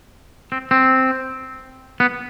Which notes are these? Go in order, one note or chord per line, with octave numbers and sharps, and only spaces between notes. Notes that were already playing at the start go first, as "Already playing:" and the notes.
C4
C4
B3